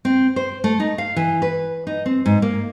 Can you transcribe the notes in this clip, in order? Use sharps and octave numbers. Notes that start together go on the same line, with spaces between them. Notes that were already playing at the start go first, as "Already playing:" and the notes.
C4
C5
A3
D#4
F5
E3
B4
D#4
C4
G#2
A#3